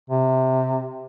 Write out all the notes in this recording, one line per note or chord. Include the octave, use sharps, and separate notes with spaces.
C3